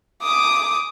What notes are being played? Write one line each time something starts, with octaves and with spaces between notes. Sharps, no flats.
D6 D#6